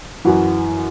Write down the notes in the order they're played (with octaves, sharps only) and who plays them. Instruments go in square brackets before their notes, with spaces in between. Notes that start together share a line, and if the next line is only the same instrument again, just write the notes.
[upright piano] F#2 E3 F#4